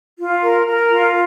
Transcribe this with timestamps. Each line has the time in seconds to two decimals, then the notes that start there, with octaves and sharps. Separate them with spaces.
0.19 F4
0.42 A#4
0.67 A#4
0.90 F4